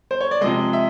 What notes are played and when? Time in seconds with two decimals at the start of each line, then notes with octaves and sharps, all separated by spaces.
0.11 C5
0.21 C#5
0.31 D5
0.41 C3 F3 G#3 D#5
0.73 E5